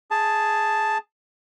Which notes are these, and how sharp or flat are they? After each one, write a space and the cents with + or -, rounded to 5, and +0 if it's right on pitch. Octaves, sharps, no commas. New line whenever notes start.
G#4 +0 A5 +0